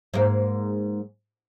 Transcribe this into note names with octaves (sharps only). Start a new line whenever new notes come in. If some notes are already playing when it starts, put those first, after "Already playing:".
G#2 A#3